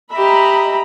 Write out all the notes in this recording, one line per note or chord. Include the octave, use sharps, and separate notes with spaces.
G4 D#5 E5 A#5 B5